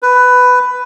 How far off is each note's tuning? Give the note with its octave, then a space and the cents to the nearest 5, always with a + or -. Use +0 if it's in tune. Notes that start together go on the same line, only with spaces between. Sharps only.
B4 +10